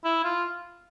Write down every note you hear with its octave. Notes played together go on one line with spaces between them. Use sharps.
E4
F4